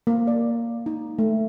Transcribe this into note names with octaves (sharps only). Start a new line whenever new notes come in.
A#3
D5
D#4
A3